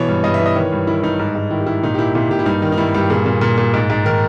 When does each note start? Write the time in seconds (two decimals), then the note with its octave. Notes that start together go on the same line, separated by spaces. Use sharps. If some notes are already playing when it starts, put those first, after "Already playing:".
Already playing: B2 E3 C#5
0.08 G2
0.24 G2 D#5
0.34 E5
0.40 E3
0.46 D#5
0.55 D#3 C#5
0.72 G2
0.87 D#3 E4
1.03 G2 D#4
1.19 G#2
1.35 G#2
1.51 D#3 E4
1.60 G4
1.66 G#2 E4
1.83 A#2 D#4
1.94 G4
1.99 A#2 E4
2.15 A#2 E4
2.30 A#2 G4
2.39 E4
2.46 G2 D#4
2.62 D#3
2.72 D#4
2.77 G2 E4
2.94 G2 G4
3.10 A#2 G#4
3.26 A#2
3.41 A#2
3.57 A#2
3.74 G#2
3.90 G#2
4.04 D#3 A#4